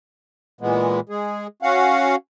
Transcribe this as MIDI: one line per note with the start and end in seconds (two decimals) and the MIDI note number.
0.61 1.00 46
0.61 1.00 52
0.61 1.00 56
0.61 1.00 59
1.09 1.47 56
1.09 1.47 68
1.62 2.16 61
1.62 2.16 66
1.62 2.16 77
1.62 2.16 78